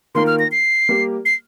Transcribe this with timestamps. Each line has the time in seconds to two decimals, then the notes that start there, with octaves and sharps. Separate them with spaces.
0.15 D#3 A#3 F4 A#4 C6
0.27 F6
0.39 A#6
0.52 C7
0.89 G3 A#3 G4 A#4
1.25 C7